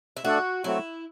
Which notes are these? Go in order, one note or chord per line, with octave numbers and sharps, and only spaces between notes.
E4
A3 D4 F#4 A4 D5
F#3 A3 C4 E4 F#4